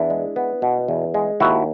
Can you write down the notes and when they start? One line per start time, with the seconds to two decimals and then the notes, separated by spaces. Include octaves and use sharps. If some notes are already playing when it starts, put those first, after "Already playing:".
Already playing: E2 D4 E4
0.10 G#3
0.36 B3
0.62 B2
0.88 E2
1.14 G#3
1.40 D#2 E4 F#4